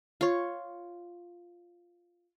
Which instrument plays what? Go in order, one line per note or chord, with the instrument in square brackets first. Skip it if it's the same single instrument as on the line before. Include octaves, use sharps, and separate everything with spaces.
[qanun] F4 C#5